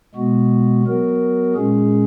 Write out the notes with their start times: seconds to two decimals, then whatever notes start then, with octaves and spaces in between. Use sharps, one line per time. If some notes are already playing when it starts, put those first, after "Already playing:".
0.15 B2 G#3 B3 F#4
0.85 F#3 B3 F#4 A#4
1.55 A#2 G#3 C#4 G#4